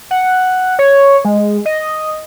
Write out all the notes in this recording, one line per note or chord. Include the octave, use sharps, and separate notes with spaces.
F#5
C#5
G#3
D#5